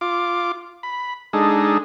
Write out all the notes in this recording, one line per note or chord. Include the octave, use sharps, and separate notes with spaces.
F4 D6
B5
G#3 D4 D#4 G#4 A4